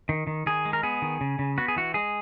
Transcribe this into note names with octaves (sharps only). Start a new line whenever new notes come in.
D#3
D#3
D#3 G#4
G#3
A#4
B3 G#4
D#3
C#3
C#3
B3 F#4
G#4
E3 F#4
G#3 G#4